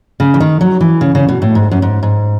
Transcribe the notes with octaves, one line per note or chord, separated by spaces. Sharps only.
C#3
E3
D#3
F#3
E3
C#3
C#3
B2
A2
G#2
F#2
G#2
G#2